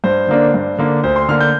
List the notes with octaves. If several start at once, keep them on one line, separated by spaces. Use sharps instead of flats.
G2 C5
D3 A#3 D4
G2
D3 A#3 D4
D2 C5
C6
D3 A#3 F6
G6